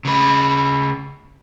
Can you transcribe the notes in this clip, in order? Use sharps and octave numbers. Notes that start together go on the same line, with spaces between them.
C#3 B4